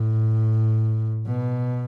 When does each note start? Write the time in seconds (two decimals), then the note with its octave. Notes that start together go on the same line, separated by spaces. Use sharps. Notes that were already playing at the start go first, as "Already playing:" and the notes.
Already playing: A2
1.26 B2